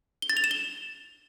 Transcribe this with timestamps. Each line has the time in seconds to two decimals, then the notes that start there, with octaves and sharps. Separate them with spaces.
0.22 G7
0.30 A6
0.37 F7
0.44 E7
0.51 G7